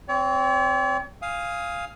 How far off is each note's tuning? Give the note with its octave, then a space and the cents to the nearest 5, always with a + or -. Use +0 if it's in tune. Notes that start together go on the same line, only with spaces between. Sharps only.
C4 +0 C#5 +45
F5 +0 G#5 -15 D#6 +20